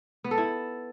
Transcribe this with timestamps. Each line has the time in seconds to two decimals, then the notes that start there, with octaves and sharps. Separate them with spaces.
0.24 B3
0.31 A4
0.38 E4